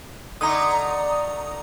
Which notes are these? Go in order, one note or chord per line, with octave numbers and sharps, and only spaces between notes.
D3 A3 D#4 A#5 D#6